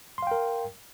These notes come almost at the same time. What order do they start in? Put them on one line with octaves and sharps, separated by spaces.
C6 F5 G5 A#4